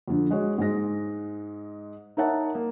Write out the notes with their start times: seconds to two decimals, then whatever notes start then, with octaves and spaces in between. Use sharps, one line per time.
0.08 F2 D3
0.31 G#3 F#4 C#5
0.58 G#2 G#3 A#6
2.17 D#4 A#4 C#5 E5 F#5 A5
2.55 A#3